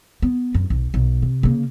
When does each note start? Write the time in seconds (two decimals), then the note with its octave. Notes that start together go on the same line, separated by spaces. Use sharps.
0.22 B3
0.54 F#2
0.70 B1
0.94 B1
1.22 C3
1.43 C#3 A#3